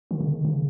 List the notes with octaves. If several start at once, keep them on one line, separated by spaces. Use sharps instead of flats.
D#3
C#3
D#3
C#3